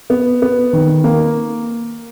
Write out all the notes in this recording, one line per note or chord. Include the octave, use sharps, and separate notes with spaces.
B3
B3
D#3
A#3